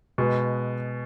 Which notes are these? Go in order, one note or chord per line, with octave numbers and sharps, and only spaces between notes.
B2 G#3 B3